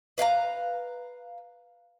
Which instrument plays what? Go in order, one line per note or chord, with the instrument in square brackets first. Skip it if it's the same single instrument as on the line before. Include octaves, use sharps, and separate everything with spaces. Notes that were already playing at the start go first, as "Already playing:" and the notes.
[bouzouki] B4 F5 G5 A#5